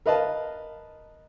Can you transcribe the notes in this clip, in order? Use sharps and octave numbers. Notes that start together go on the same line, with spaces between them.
A#4 B4 D#5 F5 A5